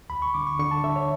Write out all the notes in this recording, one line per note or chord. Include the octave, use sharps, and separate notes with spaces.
D2 B5
C#6
D3 D6
C#6
D3 C#6
A5
D3 E5
C#5